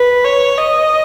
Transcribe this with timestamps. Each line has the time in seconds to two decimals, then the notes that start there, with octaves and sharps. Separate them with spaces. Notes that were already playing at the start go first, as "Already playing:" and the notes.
Already playing: B4
0.25 C#5
0.58 D#5